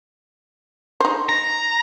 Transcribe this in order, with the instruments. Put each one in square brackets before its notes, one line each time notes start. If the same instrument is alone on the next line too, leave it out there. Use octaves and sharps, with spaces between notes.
[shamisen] D#4 C5
[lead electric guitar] A#5